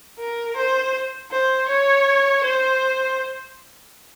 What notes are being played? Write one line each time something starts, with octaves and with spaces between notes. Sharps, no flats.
A#4
C5
C5
C#5
C5